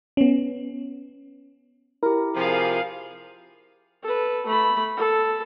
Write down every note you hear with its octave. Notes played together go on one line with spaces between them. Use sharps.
B3 C#4
E4 G4 A#4
C3 F3 G#4 F5
A4 B4
A3 B5
A4